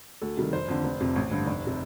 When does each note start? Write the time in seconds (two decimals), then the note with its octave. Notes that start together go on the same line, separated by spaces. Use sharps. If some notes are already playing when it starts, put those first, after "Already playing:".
0.21 D2 A4
0.37 C3 D#3 G3
0.53 F1 C5
0.68 F2 D3
0.84 F1
1.00 F2 C3
1.16 A1
1.31 G2 D3
1.47 F1
1.67 C3